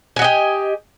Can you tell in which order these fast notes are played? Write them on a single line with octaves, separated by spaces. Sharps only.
G#5 F#4 D#5 G4